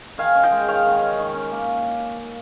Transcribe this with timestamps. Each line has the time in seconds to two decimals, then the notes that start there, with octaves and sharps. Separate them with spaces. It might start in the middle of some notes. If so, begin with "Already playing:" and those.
0.18 D#3 F5 G#5
0.35 C#4
0.43 D#5 G5
0.52 G#3
0.68 D#3 C#5 F5
0.85 D#3
1.01 C#4
1.18 D#3
1.35 C#4
1.51 A#3